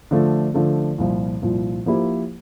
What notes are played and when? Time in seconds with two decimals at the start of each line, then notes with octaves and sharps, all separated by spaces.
0.11 D3 F3 A3
0.54 D3 F3 A3
0.98 C2 A#2 F3
1.42 C2 A#2 F3
1.86 F3 A#3 E4 G4 C5